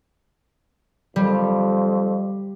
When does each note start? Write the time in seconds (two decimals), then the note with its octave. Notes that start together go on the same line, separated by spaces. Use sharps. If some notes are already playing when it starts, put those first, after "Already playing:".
1.16 F2 G3